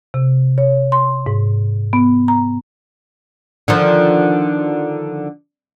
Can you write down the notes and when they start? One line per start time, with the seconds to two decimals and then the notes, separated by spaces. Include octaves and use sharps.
0.14 C3
0.58 C#5
0.92 C6
1.26 G#2
1.93 B3
2.28 A#5
3.68 D3 D#3 F3